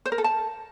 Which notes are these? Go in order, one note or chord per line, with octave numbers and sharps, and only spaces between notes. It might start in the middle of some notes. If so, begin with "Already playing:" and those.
C5
A#4
A4
A5